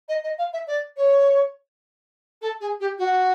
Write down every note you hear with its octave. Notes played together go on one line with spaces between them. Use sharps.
D#5
D#5
F5
E5
D5
C#5
A4
G#4
G4
F#4